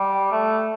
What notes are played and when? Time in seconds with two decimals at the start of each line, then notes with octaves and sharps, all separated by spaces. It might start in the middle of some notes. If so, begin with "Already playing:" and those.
Already playing: G3
0.32 A3